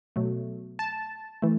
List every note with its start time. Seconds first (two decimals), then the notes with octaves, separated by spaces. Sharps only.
0.16 B2 F#3 A3
0.79 A5
1.42 E3 A3